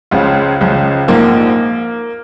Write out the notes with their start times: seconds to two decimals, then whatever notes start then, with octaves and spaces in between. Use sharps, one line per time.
0.11 C#2 C#3 F3 F4
0.61 C#2 C#3 F3
1.08 A#1 G#2 F3 A#3